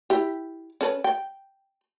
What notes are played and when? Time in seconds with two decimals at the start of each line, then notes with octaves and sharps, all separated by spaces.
0.10 E4 G4
0.81 C#4 A4 B4
1.04 G5